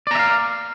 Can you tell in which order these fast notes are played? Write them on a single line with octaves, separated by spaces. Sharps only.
D5 A#5 E5 F5